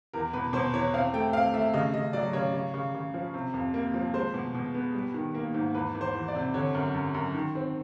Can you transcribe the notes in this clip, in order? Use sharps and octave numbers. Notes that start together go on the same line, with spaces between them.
E2 A#4
B2 B4
B2 C5
E2 C#5
C4 F5
A3 G5
C4 F5
A3 E5
C#3 D#5
C#3 D#5
F#3 D5
C#3 C#5
C#3
C#3
C#3
F3
C3
F2
A#3
F3
G#3 C5
B2
B2
B3
G3
D#3
A#3
G#2
E2 B4
E2
C5
E3
D5
C3
D3 C#5
F#2
F#2
F#2
D#3
C4